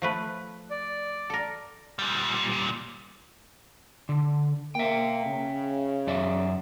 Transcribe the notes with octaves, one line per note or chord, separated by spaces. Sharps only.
F3 A3 B4
D5
A4 A#4
A#2 G3
D3
A#3 E5 G5
C#3
F#2 D5 E5